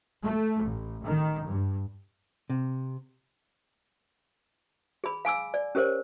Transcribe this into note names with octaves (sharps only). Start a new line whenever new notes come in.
A3
A1
D#3
G2
C3
G#4 B5
F5 G#5 D6 E6
D5
C#4 G4 A#4 C5 C#5